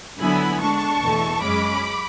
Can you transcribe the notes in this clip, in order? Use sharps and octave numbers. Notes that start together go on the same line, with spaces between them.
D3 F#3 B3 E4 G#5 B5
D3 G#3 D4 A5 C#6
E2 B2 A3
F#2 C#3 G#3 C#4 B5 D6